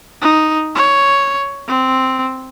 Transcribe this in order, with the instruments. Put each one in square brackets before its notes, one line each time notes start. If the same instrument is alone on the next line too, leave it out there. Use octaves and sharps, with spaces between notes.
[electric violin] D#4
C#5
C4